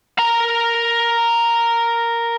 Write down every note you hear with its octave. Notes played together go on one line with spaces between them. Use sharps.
A#4 A#5